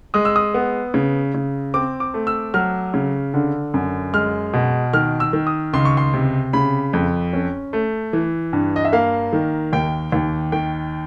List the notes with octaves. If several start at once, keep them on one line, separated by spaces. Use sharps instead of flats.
G#3 D#6
E6
D#6
B3
C#3
C#3
C4 D6
D6
A3
E6
F#3 F6
C#3
D3
F#2
G#3 F6
B2
D#3 F6
E6
D#3
D#6
C#2 C6
C#6
C6
C3
C#3 B5
F2
C#4
A3
E3
G2
D#5
E5
A#3 F5
D#3
D#2 G5
D#2
D#3 G5